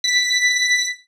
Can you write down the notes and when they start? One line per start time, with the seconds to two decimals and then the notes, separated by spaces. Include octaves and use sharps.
0.04 B6